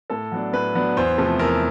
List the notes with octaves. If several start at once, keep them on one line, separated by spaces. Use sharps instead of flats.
A2 A4
F#3 B3 D4
A2 B4
F#3 B3 D4
E2 C5
C3 F3 A3
E2 A#4